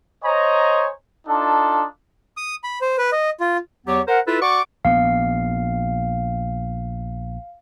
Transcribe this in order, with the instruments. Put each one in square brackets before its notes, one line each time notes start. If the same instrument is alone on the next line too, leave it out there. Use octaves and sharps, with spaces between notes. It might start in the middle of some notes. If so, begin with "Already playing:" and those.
[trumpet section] C5 C#5 D#5 G#5 A#5
D4 D#4 F4 A4 A5
[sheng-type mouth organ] D#6
B5
C5
B4
D#5
F4
[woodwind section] E2 F#3 B3 G4 C#5 D6
A#4 C5 F#5
E4 F4 A4 B4
F#4 D5 C#6 D6
[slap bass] A#1 B3 [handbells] F5